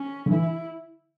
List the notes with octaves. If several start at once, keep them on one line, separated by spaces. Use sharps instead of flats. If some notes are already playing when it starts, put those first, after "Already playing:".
Already playing: C#4
D3
E3 E4